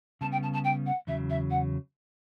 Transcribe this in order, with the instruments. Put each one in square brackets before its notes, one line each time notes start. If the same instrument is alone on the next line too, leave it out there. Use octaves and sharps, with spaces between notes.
[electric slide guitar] C#3 G3 B3 [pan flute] A5
[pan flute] G5
A5
A5
G5
F#5
[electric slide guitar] E2 C#3 F#3 [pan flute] E5
[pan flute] E5
F#5